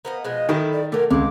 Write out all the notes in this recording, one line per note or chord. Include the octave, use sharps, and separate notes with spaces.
A#3 B3 C5 D#5
B2 F3 G#3 D#5
A2 D#3 E4 A4
D5
D3 F#3 A3 A#4
C#2 G#3 D6